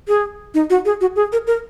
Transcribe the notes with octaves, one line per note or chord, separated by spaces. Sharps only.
G#4
D#4
F#4
G#4
F#4
G#4
A#4
A#4